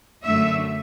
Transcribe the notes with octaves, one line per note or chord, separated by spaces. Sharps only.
F#2 D3 A3 E5